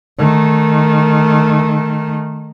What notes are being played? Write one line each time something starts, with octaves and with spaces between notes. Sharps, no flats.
D#3 A3